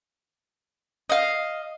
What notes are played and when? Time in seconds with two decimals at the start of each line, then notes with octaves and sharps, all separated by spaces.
1.10 D#5 F5